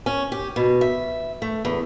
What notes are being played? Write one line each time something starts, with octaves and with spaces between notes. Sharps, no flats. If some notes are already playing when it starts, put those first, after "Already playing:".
C#4
G4
B2
E5
A3
E2